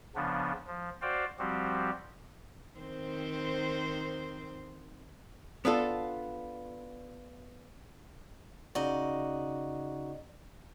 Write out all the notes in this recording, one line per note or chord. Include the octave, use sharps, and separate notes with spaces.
C#3 F3 B3 D4
F3
F#4 C5 D5 F5 G5
F3 G3 C4 F#4 G4
D#3 C4 C5
B3 D4 F4 A4
C#3 D#4 F#4 D5 D#5